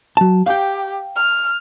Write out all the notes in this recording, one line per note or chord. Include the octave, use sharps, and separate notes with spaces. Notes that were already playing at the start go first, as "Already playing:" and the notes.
F#3 A5
G4 F5 G5
F6